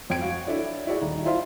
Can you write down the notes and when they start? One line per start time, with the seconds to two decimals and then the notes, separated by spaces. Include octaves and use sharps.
0.10 F2 G5 G#6 D7
0.21 F#4 F5
0.47 D4 E4 A4 C#5 D5
0.87 E4 F#4 G#4 D5
1.01 D#1 D#4
1.25 E4 F4 C5 E5 F5